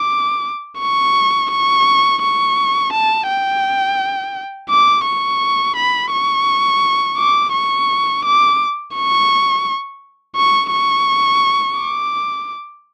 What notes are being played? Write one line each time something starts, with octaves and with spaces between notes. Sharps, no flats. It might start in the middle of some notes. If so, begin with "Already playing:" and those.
Already playing: D6
C#6
C#6
C#6
A5
G5
D6
C#6
B5
C#6
D6
C#6
D6
C#6
C#6
C#6
D6